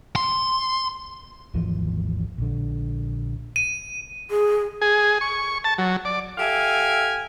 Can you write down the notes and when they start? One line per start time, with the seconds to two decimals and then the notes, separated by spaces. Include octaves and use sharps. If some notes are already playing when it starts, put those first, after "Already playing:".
0.16 C6
1.54 G#1 D#2 E3 F3
2.38 A#1 D3
3.56 D#7
4.30 G#4
4.81 G#4
5.21 C#6
5.64 A5
5.78 F#3
6.05 D5
6.38 G4 A4 E5 F5 G#5